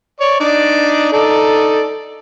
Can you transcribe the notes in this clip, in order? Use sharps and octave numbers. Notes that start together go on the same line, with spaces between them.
C#5 D5 C#6
D4 D#4 D5
D#4 A4 D5